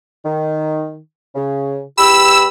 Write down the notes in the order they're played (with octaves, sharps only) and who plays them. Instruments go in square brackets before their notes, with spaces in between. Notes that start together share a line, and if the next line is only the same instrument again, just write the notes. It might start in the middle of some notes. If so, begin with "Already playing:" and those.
[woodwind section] D#3
C#3
[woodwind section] E2 G4 B5 [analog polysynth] E6